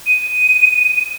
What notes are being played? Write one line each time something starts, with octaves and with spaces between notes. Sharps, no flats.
D#7